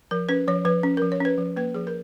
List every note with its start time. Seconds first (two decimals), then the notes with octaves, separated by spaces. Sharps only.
0.11 F3 A#4
0.29 C#4 B4
0.48 F3 C#5
0.65 F3 B4
0.83 C#4
0.97 F3 A#4
1.12 C#5
1.20 C#4 B4
1.38 F3
1.56 A#3 B4
1.75 F3 G#4
1.87 A#4